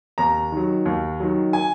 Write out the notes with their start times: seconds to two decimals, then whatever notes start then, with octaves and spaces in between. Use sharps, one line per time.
0.18 D#2 A#5
0.52 D#3 F#3
0.86 D#2
1.20 D#3 F#3
1.53 G#5